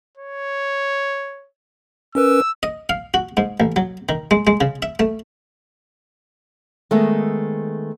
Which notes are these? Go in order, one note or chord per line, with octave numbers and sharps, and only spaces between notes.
C#5
C#4 A#4 B4 E6
D#5
F5
F#4
G#2
A1
F#3
D#3
G#3
G#3
C#3
E5
A3
D#3 G#3 A3 B3 E5